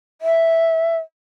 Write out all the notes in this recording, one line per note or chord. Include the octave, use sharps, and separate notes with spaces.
E5